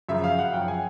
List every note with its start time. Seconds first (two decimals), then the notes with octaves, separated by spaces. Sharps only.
0.09 F#2 C#3 F3 E5
0.24 F5
0.38 F#5
0.53 F#2 C#3 F3 G5
0.68 G#5